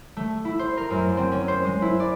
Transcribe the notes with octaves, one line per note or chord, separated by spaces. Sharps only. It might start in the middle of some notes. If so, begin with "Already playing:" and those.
A3
E4
C5
A#4
F#2
C4
C#4
C5
G#3
E4
D5